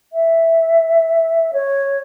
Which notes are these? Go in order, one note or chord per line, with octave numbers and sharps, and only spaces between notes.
E5
C#5